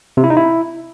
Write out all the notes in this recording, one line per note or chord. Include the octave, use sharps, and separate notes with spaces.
C3
E4
D#4
E4